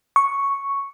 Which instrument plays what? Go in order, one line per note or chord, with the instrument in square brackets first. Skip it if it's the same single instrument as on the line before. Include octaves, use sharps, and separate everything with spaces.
[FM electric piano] C#6